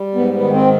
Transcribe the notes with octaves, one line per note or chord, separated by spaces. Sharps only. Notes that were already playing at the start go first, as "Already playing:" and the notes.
Already playing: G3
G#2 B3
B3
D#3
C4